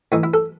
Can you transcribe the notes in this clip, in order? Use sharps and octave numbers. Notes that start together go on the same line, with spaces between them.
A2 E3 D#4
E4
A4